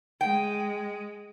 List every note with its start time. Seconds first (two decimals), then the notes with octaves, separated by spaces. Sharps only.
0.21 G#3 G5